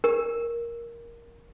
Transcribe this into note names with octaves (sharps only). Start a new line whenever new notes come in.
A#4